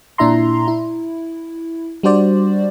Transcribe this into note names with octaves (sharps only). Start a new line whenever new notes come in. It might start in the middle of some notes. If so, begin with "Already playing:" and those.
A#2 D4 E4 E5 A#5 C6
E4
G3 D4 F#4 C5 D5